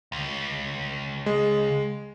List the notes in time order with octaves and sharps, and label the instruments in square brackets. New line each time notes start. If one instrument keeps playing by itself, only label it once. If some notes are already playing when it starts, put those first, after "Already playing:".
[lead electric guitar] C#2
[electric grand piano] G#3